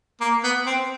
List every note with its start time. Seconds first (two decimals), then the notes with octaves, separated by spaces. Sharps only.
0.21 A#3
0.44 B3
0.66 C4